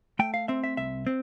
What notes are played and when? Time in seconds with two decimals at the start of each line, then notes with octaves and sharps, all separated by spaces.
0.19 A3 G5
0.34 F5
0.48 C4 E5
0.64 E5
0.77 C2 E5
1.07 C4